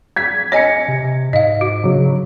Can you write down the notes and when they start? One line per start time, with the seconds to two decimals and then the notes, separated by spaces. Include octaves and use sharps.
0.16 G#6 B6
0.52 C#5 D#5 G#5 A#6 C#7
0.88 C3
1.33 G#2 D#5 F5
1.61 F#4
1.83 C#3 F#3